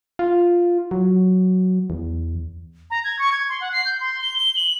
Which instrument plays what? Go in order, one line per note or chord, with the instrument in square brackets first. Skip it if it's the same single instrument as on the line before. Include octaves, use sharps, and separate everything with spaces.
[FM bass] F4
F#3
E2
[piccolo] A#5
G#6
C#6
G#6
C6
F#5
C7
G6
C6
G7
G7
F#7